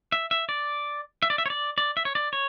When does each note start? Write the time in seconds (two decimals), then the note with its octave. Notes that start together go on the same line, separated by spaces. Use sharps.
0.12 E5
0.31 E5
0.49 D5
1.23 E5
1.30 D5
1.38 E5
1.46 C#5
1.50 D5
1.78 D5
1.97 E5
2.05 C#5
2.15 D5
2.33 C#5